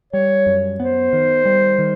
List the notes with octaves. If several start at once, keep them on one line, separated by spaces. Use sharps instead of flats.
G3 C#5
F#2
B3 C5
D#3
G3
D#3